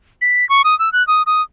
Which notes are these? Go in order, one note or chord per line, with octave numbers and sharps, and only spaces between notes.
B6
C#6
D#6
E6
F#6
D#6
D#6